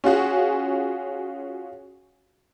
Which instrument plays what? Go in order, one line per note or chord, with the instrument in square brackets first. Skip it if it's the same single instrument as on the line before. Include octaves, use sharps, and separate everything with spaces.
[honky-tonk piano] C#4 F4 F#4 G#4